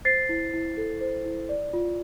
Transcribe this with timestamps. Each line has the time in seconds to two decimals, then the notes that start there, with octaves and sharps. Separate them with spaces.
0.05 C5 A6 C7
0.29 E4
0.53 E4
0.77 A4
1.01 C5
1.25 E4
1.49 D5
1.73 F4